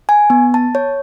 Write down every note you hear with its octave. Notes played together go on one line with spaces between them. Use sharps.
G#5
B3
A5
C#5